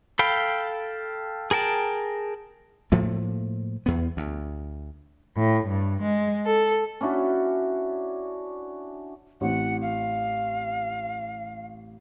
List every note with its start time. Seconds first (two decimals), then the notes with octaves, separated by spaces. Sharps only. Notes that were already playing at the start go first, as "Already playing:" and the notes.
0.19 A4 F5 G5 B5
1.51 G#4 A#4 G5 A5
2.92 A2 F3 A3 A#3
3.86 E2 B3
4.17 D2
5.36 A2
5.67 G2
6.02 G#3
6.46 A4
7.01 C#4 D4 E4 F#4
9.41 A1 C4 F#5
9.81 F5